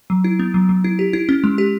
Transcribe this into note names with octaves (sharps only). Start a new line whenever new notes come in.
F#3
E4
B3
F#3
F#3
E4
G4
E4
C#4
G#3
G4